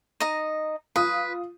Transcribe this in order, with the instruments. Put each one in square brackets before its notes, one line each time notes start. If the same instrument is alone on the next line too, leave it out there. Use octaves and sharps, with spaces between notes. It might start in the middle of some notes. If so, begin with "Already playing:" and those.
[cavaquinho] D#4 D#5
[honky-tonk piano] F4 D#6 [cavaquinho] B4